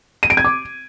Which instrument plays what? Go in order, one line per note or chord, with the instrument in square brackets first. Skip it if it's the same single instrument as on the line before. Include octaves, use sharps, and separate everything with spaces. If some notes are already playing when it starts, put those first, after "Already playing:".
[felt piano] D#7
D7
G#6
D6